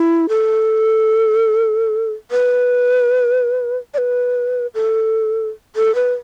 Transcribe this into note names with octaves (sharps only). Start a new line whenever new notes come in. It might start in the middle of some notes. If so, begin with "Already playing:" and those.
Already playing: E4
A4
B4
D5
B4
A4
A4
B4